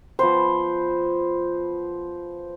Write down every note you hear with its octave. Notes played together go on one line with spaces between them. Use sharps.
F3 B3 C5